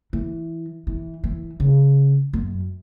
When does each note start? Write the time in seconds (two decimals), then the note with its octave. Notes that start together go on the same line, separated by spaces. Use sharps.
0.13 E3
0.87 E3
1.24 E3
1.60 C#3
2.33 F#2